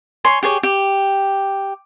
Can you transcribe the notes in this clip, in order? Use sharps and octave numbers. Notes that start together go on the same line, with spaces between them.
C#5 G#5 C6
G4 G#4 C#5
G4